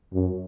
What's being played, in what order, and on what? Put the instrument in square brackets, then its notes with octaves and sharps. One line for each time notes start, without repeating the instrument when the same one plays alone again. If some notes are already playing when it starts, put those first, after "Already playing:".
[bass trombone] F#2